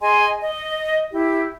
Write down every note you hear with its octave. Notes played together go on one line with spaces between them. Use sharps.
G#4 D#5 G#5 C6
D#5
E4 G4